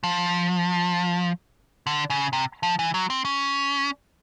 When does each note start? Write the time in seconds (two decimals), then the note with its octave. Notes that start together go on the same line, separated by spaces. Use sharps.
0.03 F3
1.87 D3
2.10 C#3
2.33 C3
2.63 F3
2.79 E3
2.94 F#3
3.10 C4
3.25 C#4